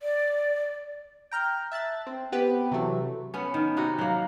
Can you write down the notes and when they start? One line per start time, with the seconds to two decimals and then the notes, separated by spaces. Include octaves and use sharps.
0.02 D5
1.31 G5 A#5 F6 G6
1.72 E5 A5 F#6 A6
2.07 C4
2.32 B3 C4 G4 B4
2.72 C3 E3 F#3 A3
3.34 B3 C#4
3.54 D#3
3.77 C3 D#4 F#4
3.98 F#3 A#3